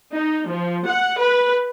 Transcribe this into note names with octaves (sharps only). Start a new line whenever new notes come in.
D#4
F3
F#5
B4